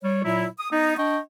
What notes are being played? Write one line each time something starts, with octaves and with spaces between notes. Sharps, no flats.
G3 C#5
A#2 F#3 E4
D#6
B3 D#4
D4 D#5 G5 C#6